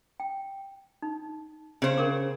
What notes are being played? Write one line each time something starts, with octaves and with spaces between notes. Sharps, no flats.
G5
D#4
C#3 C5
C#4 A#4 D6